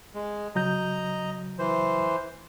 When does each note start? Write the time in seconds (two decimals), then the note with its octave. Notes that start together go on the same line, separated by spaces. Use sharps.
0.15 G#3
0.55 C#3 F#3 D#5 A#5 G6
1.59 E3 C5